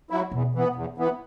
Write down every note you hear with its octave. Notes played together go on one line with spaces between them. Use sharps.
F#3 E4
E2 B2
E3 B3
E2
E3 B3